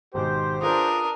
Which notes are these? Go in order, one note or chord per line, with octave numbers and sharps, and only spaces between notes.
G#1 G#2 B2 G4 C5
D4 F4 G#4 A#4 B4 D#6